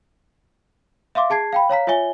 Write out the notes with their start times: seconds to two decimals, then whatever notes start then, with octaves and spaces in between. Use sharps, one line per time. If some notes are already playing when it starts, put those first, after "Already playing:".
1.15 E5 F5 C6 D6
1.30 G#4 A5 G#6 C7
1.53 F5 G5 B5
1.69 C#5 F5 A#5 B6
1.87 F4 C#5 E5 G#5 G7